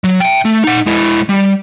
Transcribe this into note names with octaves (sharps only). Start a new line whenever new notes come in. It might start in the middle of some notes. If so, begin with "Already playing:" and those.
F#3
E5 G5
A3
D#4 F#5
G#3 E4
G3